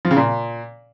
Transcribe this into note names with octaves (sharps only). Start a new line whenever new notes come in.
F3
C#3
A#2